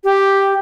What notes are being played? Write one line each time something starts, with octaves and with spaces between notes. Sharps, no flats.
G4